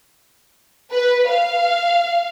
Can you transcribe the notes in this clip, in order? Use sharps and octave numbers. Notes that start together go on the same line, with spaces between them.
B4
F5